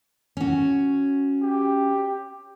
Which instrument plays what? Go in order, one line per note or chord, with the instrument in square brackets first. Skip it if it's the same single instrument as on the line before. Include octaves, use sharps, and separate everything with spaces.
[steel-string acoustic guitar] C#4 F#4
[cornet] G4